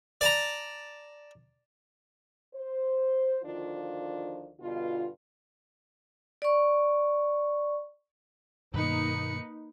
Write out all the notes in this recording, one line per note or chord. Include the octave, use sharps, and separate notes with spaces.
D5 A5 A#5
C5
D2 D#3 F3 D4 F4
G2 B2 D3 F4
D5 C#6
G2 B2 D#3 A#3 D#4 B4 C#7